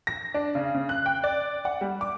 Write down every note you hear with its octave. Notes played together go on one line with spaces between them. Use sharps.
A#6
D4
C#3
C#3
F#6
G5
D5
F#5
G3
D6